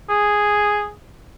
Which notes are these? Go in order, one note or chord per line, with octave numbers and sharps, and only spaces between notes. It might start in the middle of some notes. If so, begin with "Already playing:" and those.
G#4